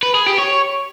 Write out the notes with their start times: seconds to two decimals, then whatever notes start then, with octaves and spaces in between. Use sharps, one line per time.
0.03 B4
0.15 G#4
0.27 G4
0.39 C#5